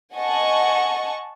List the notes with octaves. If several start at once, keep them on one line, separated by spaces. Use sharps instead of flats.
D#5 F#5 G#5 A5 C#6